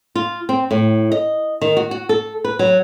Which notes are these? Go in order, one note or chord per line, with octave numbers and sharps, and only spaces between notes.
F4
C4
A2
D#5
D#3
F#4
F#4
A4
B4
F#3